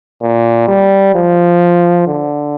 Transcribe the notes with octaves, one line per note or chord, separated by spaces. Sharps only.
A#2
G3
F3
D3